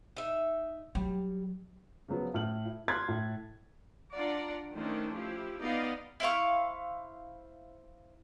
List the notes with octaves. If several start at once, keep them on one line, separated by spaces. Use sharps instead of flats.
D#4 E5
F#3 G3
C#3 F3 F#3 B3
A2 F6 F#7
E4
C6 F6 F#6 G#6 A6 B6
A2
D4 F4 D5 F#5 A#5
D#3 A3 C#4 D4 C5
F3 E4 G4
B3 D#4 D5 D#5 F5
E4 C5 F5 C#6